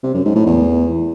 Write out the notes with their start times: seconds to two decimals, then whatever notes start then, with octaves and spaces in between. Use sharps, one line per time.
0.04 C3
0.14 F#2
0.25 G#2
0.36 A2
0.46 E2